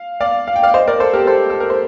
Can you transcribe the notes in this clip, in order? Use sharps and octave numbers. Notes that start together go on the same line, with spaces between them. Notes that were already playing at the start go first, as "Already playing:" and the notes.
Already playing: F5
D5 F5
F5
G5
D5 F5
C5 D#5
A#4 D5
A4 C5
G4 A#4
A4 C5
A4
A#4
C5